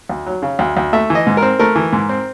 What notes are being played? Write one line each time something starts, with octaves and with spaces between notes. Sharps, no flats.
D2
F#3
C#3
D2
D2
A3 E5
E3
D#5
G#2
A#4
C4
A3 A#4
E3
G#2
C4